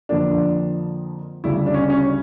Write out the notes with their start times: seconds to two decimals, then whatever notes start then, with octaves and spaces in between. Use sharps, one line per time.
0.09 F2 D3 F3 A#3 D4
1.44 D2 C#3 G3 E4
1.66 D4
1.74 C#4
1.82 D4
1.90 C#4